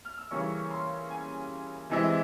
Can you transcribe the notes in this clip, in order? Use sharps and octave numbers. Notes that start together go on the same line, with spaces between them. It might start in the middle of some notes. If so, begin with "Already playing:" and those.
F6
E6
C#3 E3 G3 A#3 C#4 C#6
C6
G#5
C3 E3 G#3 C4 E4